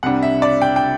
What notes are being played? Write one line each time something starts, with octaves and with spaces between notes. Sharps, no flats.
C2 C3 G3 D4 F#5
E5
D5
G5
G5